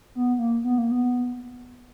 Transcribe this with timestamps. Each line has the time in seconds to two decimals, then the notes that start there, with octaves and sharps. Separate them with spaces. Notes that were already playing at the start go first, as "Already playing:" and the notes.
0.15 B3
0.39 A#3
0.64 B3
0.78 A#3
0.91 B3